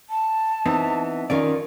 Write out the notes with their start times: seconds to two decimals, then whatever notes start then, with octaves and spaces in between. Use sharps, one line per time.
0.10 A5
0.66 E3 B3 C4 D#4
1.30 D#3 C#4 F4 D5